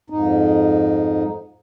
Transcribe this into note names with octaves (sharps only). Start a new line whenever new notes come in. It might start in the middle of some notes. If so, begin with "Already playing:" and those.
F2 G#2 D#4